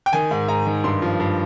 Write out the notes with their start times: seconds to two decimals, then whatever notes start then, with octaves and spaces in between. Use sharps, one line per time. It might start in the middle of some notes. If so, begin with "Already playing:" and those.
0.06 G5
0.13 D#3 G#5
0.31 G#2
0.48 G#2 A#5
0.66 D#3
0.84 G2 C6
1.02 F3
1.20 G2